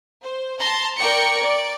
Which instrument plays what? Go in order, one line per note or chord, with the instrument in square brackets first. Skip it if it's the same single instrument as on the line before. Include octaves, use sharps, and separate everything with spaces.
[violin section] C5
A5 A#5 C6
A#4 D5 G5 A#5 C#6 C#7
D5